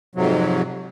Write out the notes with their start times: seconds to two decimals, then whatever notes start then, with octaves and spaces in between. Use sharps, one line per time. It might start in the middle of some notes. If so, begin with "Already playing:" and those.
0.15 F2 G#2 C3 F#3